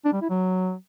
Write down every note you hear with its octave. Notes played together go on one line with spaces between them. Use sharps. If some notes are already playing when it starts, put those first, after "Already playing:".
D4
G3
E4
F#3